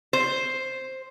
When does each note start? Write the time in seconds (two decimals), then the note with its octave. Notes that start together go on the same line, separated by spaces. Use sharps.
0.13 C5